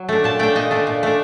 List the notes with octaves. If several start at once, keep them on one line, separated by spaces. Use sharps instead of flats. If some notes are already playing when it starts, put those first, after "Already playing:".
Already playing: F#3
A3 D4
A#2 A5
A3 D4 G5
A#2 D#5
A3 D4
A#2
A3 D4